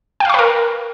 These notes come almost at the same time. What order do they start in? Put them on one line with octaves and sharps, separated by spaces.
G5 F5 C#6 B4 A#4